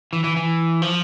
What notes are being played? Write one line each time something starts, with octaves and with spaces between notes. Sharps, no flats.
E3
E3
E3
F3